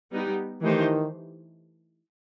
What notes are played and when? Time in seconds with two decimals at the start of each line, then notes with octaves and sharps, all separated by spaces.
0.11 G3 B3 D#4 G4
0.62 D#3 E3 A3 D#4 G4 C5